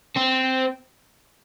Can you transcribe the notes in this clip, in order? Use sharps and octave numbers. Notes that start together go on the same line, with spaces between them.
C4